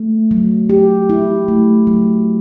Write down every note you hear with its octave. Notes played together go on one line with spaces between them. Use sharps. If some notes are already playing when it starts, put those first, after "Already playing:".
Already playing: A3
F#3
G4
E4
A3
F#3